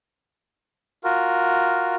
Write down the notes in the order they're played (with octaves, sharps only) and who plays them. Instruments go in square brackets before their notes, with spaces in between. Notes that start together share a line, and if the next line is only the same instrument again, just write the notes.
[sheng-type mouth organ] F4 F#4 A#4